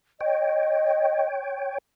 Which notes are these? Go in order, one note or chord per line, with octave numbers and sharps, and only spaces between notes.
C#5 D#5 G5